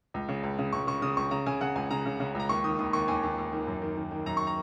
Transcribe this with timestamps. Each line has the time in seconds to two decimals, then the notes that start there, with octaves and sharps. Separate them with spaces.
0.14 C#2
0.29 C#3
0.43 C#2
0.59 C#3
0.73 C#2 C#6
0.87 C#3 C#6
1.02 C#3 D#6
1.17 C#2 C#6
1.31 C#3 A#5
1.47 C#3 G#5
1.61 C#3 F#5
1.75 C#2 G#5
1.91 C#3 A#5
2.06 C#3
2.20 C#3
2.35 C#2 A#5
2.49 D#2 C#6
2.64 D#3 D#6
2.79 D#2 D#6
2.93 D#2 C#6
3.08 D#2 G#5
3.23 D#2
3.38 D#2
3.52 D#3
3.67 F#2
3.82 D#3
3.97 D#3
4.11 D#3
4.26 F#2 A#5
4.37 C#6
4.47 A#5